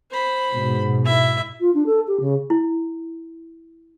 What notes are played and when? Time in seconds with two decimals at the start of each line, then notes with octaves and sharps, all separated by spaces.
0.11 C5 B5
0.52 G#2 B2
1.05 E4 E5
1.60 F4
1.74 D4
1.85 A4
2.07 G4
2.19 C#3
2.50 E4